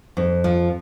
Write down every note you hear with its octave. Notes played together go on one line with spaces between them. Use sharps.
F2
F3